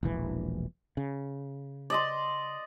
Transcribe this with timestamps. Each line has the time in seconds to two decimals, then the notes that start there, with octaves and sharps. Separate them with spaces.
0.03 E1 A#1 E3
0.97 C#3
1.90 D5 D#5 C6